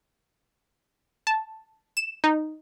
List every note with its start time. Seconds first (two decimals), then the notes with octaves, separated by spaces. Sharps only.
1.27 A5
1.97 E7
2.24 D#4